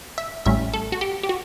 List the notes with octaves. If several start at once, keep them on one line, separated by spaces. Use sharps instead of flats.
E5
A1 A2 G3 C#4 E5
A4
F#4
G4
G4
F#4